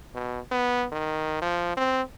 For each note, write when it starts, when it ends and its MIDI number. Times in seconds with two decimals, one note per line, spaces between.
0.15 0.40 47
0.52 0.85 59
0.92 1.40 51
1.42 1.74 53
1.77 2.02 60